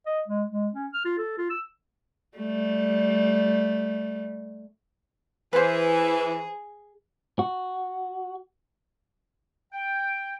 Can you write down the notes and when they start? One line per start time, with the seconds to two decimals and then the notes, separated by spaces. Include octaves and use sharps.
0.06 D#5
0.28 G#3
0.51 G#3
0.74 C#4
0.94 F6
1.05 F4
1.18 A4
1.38 F4
1.50 E6
2.38 G3 A3
5.53 E3 G#4 B4 C5
7.39 F#4
9.73 G5